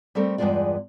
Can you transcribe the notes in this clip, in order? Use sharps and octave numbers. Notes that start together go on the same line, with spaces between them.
G3 A3 C4 A4 A#4
E2 G2 G#3 B3 F4 D5